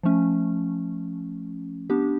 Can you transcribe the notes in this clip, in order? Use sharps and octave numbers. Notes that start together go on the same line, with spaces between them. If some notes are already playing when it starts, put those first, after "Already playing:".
F3 A3 C#4
B3 D4 G4